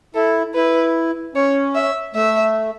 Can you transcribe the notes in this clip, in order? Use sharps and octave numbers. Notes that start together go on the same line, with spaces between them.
E4 A4
E4 B4
C#4 C#5
E5
A3 E5